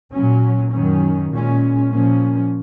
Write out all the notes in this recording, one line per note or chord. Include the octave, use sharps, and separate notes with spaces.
A#2 F#3 C#4
F#2 D#3 F#3 C#4
A#2 G#3 C#4
A#2 F3 A#3 C#4